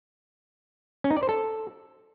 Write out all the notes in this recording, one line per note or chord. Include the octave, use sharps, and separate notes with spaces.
C#4
D#4
D5
C5
A4